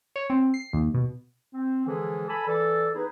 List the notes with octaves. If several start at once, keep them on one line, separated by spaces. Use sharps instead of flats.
C#5
C4
C7
D#2
B2
C4
D3 E3 F3 G#3 G#4 A4
A4 G#5 A5 B5
E3 A4 D5
B3 D#4 E4 G#4 B4